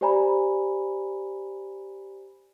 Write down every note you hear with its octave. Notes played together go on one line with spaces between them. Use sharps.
G4 C5 D5 G#5 A#5 B5